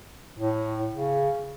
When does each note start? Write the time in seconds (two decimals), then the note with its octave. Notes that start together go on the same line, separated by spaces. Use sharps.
0.39 A2
0.92 C#3